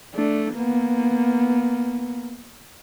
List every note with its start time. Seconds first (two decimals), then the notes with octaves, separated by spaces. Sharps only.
0.15 A3 D4
0.54 A#3 B3